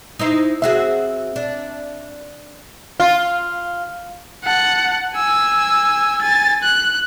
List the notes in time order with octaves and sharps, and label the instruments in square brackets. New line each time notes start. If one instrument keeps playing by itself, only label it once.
[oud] D#4 E4 C5
[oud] C4 F#4 G#4 [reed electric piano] E5
[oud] D4
[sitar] F4
[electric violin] F#5 A5
G#5 E6
G#5 A6
F#6